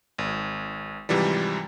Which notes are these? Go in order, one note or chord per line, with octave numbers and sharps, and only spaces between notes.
G#1
G#2 C3 E3 F3 G3